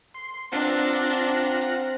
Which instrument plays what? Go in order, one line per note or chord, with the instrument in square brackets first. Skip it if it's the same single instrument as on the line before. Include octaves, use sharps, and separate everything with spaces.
[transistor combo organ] C6
[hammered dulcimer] C4 [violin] D4 [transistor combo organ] F4 F#5 A#5